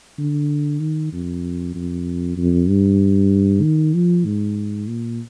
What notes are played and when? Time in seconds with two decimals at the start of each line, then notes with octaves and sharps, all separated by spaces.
0.18 D3
0.80 D#3
1.12 F2
1.74 F2
2.37 F2
2.68 G2
3.62 D#3
3.94 F3
4.25 G#2
4.87 A#2